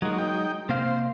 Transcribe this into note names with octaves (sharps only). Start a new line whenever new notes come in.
F#3 G#3 A#3 D#4 F#4
D#4 G5
C3 A#3 C5 F5